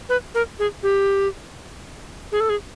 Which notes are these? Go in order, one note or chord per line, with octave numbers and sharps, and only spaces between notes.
B4
A#4
G#4
G4
G#4
A4
G#4